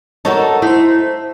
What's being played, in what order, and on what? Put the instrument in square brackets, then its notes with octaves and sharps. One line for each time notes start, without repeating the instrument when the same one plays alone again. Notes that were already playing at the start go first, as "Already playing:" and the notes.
[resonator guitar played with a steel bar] D#4 F#4 [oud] A4 A#4 C#5 [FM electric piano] A5
[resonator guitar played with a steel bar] A3 [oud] D#4 [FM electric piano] E4 C5